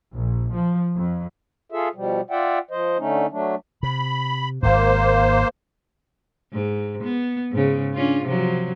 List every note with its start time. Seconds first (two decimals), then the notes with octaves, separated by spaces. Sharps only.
0.13 A#1
0.54 F3
0.95 F2
1.72 F4 G#4 A4 E5
1.95 B2 F3 G3
2.31 F4 D5 E5 F#5 G5
2.71 F3 C5 D#5
2.98 D3 A3 C#4 D#4
3.31 F#3 A3 D4
3.83 C3 B5
4.63 G#1 G#2 A#3 C5
6.53 G#2
7.03 B3
7.51 G#2 C#3
7.94 C#4 D4 F4
8.25 C3 F3 F#3